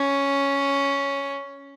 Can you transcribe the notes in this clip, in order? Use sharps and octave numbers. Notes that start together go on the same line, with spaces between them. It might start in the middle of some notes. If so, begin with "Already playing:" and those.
Already playing: C#4